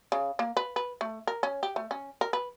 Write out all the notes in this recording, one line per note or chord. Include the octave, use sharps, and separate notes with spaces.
C#3
A#3
B4
B4
A3
A#4
C#4
G4
A3
C#4
A#4
B4